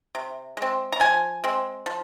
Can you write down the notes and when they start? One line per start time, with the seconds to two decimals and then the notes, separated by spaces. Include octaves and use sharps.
0.15 C3
0.57 G#3 C4
0.92 A#5
1.00 F3 G#5
1.44 G#3 C4
1.86 F3